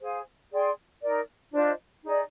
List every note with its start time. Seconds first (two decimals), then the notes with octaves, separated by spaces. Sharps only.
0.01 G#4 C5 F5 G#5
0.51 G#4 D5 G5 C6
1.01 D#4 A#4 D5
1.52 D4 F4 C5 D#5
2.02 D#4 G#4 D5